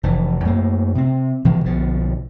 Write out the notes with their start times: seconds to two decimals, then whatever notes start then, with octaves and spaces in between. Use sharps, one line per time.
0.03 F1 E3
0.45 F#2 A3 A#3
0.95 C3 C4
1.45 B2 E3 F3 G#3
1.64 B1 B2 D3 F3